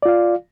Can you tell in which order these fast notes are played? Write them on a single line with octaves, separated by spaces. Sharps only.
D5 F4 F5